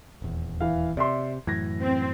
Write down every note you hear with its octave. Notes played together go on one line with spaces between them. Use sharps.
D#1 E2
E3 F5
C3 D5 E5 C6
F#2 A2 E3 G#6 A#6
C4